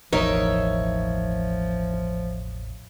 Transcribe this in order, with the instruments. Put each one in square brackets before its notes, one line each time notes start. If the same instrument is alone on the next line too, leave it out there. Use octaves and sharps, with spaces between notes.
[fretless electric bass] E1 A1 [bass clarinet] F3 [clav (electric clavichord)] D#4 A#4 D#5 [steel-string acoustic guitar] C#5 E5